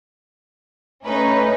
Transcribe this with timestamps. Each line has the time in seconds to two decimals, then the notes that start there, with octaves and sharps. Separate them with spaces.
1.04 A3 C#4 D#4 B4